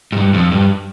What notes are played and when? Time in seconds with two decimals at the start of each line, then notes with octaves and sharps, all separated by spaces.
0.12 G#2
0.17 G2
0.34 F2
0.52 G2